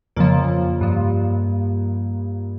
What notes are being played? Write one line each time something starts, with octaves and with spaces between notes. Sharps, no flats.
F2 C#3 F3 A#3
G2 F3